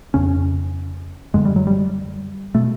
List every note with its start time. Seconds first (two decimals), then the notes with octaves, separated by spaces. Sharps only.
0.14 F2 C#3 C#4
1.34 F#2 D3 G#3
1.45 G3
1.56 F#3
1.67 G3
2.55 B2 A3